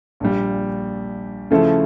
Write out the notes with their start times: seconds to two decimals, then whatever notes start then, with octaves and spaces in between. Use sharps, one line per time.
0.20 A#1 A#2 G3
1.51 C#3 F3 A3 E4 A4